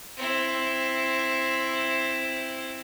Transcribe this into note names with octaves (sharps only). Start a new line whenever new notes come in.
C4 E4